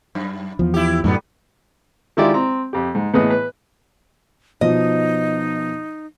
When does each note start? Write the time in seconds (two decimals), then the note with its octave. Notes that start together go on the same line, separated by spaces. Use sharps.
0.15 F#2
0.59 E2 F3
0.74 E4 G4
1.04 F#2 A2 D3 G3 B3
2.17 D#3 G#3 E4 F4 G4 D5
2.34 C4 A#5
2.73 F2 G4
2.95 G#2
3.14 A2 E3 B3 G#4 D#5 D#6
3.30 B4
4.61 B2 F3 D#4 D#5